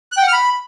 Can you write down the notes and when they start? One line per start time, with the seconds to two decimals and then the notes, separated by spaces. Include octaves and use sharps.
0.12 F#6
0.17 G5
0.22 F#5
0.28 F6
0.33 B5